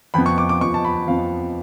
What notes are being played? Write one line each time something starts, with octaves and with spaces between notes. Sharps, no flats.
F2 F3 B3 B5
C#6
D6
D6
F2 F3 B3 C#6
A5
B5
F2 F3 B3 F5